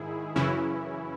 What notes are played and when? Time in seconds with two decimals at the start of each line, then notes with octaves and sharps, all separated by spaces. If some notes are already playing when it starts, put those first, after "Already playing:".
Already playing: G#2 D#3 E4 G#4
0.36 F#2 C#3 E3 C#4 E4